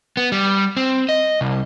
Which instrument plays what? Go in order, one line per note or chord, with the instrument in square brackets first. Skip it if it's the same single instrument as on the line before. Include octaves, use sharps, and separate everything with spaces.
[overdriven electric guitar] B3
G3
C4
D#5
C2